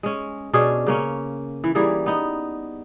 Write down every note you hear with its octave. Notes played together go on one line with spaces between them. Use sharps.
G#3 C#4
B2 C#4 D4 G#4
C#3 A#3 C#4
E3
E3 G3 A#3 G#4
B3 D#4